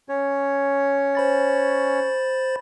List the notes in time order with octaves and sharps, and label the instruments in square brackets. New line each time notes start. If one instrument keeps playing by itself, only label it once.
[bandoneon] C#4 C#5
[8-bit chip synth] C5 B5 A6